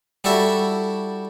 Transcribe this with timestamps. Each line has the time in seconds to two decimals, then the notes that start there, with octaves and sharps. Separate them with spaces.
0.24 G3 E4 F#4 A4 E5